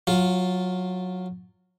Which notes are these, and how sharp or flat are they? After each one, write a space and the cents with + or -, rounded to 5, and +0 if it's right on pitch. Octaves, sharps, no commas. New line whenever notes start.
F#3 -15 F4 +5